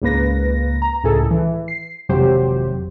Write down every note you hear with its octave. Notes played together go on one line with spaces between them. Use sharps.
C#2 G#2 A#3 B4 A#6
A#5
C#2 A2 G#4 A4
E3
C7
G#1 F2 C3 F#3 G4 C5